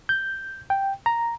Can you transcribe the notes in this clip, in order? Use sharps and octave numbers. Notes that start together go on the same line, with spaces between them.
G6
G5
A#5